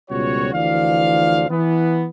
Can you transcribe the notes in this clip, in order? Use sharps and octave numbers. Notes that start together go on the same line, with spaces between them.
C#2 B2 F3 G3 F#4 C#5
D2 E3 F3 D5 F5
E3 B3